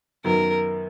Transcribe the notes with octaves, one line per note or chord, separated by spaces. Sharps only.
F#2 D#3 F#3 B3 A#4